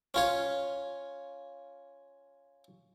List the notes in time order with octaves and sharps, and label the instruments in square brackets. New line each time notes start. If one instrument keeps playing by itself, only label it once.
[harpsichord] C#4 F4 C#5